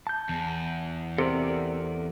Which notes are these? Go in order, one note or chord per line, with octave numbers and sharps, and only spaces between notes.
A5 G6
E2
C3 A4 A#4 D5